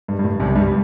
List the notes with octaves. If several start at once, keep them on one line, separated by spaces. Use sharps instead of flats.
G2
G2
A2
C2 C3
G2 G3